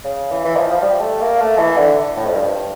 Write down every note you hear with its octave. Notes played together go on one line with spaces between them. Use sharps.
C#3
E3
E3
F3
F3
G3
A3
A#3
A3
E3
D3
A2
F2
G2